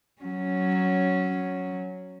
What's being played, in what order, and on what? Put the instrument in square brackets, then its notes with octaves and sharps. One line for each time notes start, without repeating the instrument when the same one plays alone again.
[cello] F#3 C#4